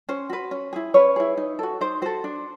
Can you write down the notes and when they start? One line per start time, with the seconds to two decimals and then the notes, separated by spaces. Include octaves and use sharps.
0.09 C#4 C5
0.30 F#4 B4
0.51 C#4
0.73 E4 G#4
0.94 C#4 B4 C#5
1.16 E4 G#4
1.37 D#4
1.59 F#4 A4
1.81 D#4 C5
2.02 F#4 A4 C5
2.24 D4